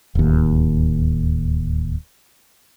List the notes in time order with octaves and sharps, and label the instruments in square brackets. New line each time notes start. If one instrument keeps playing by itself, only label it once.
[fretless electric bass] D1 D#2